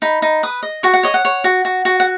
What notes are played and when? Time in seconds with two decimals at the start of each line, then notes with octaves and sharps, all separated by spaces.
0.02 D#4 B5
0.22 D#4
0.43 B4 D#6
0.63 D#5
0.83 F#4 C#6
0.94 F#5
1.03 C#5 D#5
1.14 F#5
1.25 C#5
1.44 F#4
1.65 F#4
1.85 F#4
2.00 F#5